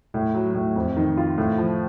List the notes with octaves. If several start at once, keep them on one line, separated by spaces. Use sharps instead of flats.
A2
F#3
A2
F2
D#3
F4
A2
F3